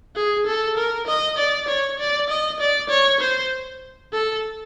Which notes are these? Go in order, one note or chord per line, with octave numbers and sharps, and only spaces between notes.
G#4
A4
A#4
D#5
D5
C#5
D5
D#5
D5
C#5
C5
A4